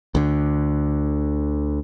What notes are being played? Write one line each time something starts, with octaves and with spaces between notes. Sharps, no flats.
D2 D3